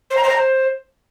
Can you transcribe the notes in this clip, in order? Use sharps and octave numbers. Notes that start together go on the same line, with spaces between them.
C5
A#5
C5
A#5
C5